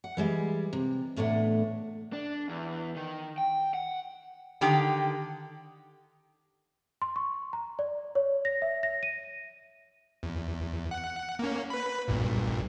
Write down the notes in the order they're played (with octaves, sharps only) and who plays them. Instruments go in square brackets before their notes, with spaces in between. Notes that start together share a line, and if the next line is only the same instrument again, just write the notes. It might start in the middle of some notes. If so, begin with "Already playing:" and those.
[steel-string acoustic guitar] F#5
E3 G3 G#3
C3
E2 A2 A3 D4 F#5
[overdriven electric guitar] D4
E2
D#3
G5
F#5
[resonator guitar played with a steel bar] D3 D#3 G4
[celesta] C6
C#6
A#5
D5
C#5
A#6
E5
A#6
D#7
[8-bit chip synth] E2
F#5
A#3 C#4
B4 B5
B1 G2 A#2